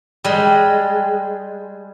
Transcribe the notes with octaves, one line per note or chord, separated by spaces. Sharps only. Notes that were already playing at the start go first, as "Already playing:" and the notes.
G3 G#3